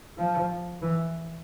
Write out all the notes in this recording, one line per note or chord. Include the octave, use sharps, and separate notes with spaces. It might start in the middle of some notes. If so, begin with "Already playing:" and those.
F3
E3